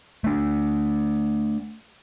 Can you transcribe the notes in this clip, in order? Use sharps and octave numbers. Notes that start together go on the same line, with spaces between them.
A3 D4